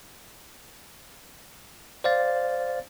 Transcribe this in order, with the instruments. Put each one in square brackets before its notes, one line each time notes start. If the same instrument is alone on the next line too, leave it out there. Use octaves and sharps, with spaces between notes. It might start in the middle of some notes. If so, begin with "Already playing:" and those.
[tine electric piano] C5 D5 F5 A6